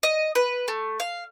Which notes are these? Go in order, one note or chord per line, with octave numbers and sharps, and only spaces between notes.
D#5
B4
A3
F5